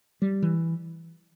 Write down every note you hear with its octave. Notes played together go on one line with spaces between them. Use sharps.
G3
E3